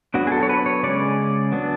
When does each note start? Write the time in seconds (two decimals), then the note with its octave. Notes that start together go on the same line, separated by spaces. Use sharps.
0.14 F#3 B3 D4 F#4
0.27 G#4
0.32 A4
0.43 C#5
0.49 B4
0.66 C#5
0.83 C#3 G#3 C#4 D5
1.52 F#3 B3 D4